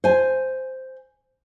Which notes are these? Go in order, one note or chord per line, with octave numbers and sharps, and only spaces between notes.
C5 G#5